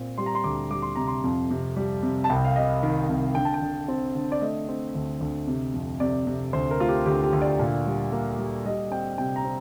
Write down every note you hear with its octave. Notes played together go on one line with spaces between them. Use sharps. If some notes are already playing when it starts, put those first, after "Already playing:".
Already playing: A#2 C4
G3 C6
A#5
C6
D2 D6
G3 D6
C6
C3 A#5
C6
F2
C3
G3
C3
A5
C2 G5
F5
C3 D#5
D#3
C2
D3 G5
A5
G5
D3
C4
D3
D5
A3 D#5
C4
D2
D2
C3
F2
C3 D5
C3
D2 C5
A#4
A3 F4
G4
D2 G4
G4
D2
D5
A#2
G3
A#3
G3
G3 D#5
C4 G5
C3 G5
A#5
C4